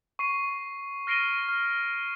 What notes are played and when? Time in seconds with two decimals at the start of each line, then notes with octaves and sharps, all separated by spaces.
0.19 C#6 C7 D#7
1.07 F6 A#6 C7 D7 D#7 G7
1.49 F6